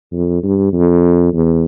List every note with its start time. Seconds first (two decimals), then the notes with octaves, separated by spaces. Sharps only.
0.12 F2
0.43 G2
0.73 F2
1.33 E2